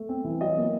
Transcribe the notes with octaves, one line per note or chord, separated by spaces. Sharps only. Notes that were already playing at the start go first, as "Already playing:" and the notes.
Already playing: A3
C4
E3
F#3 D#5
A#3